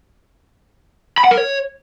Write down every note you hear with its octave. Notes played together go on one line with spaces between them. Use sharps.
B5
F#5
A#4
C#5